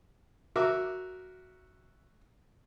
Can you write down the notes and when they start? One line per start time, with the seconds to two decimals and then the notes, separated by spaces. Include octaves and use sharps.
0.56 F#4 A#4 E5 D6